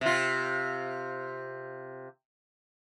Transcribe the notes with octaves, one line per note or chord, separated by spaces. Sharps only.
C3 F4